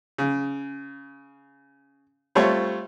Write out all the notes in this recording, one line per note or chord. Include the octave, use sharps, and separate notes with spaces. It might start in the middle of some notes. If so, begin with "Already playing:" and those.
C#3
G3 A3 C4 F4 C#5